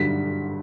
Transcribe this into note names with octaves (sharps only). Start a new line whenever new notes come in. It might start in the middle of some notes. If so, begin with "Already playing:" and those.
Already playing: G2 D3 F#3 B6